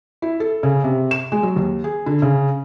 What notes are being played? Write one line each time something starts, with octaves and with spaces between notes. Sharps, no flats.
E4
A4
C#3
C3
E7
G#3
F#3
D#2
G#4
D3
C#3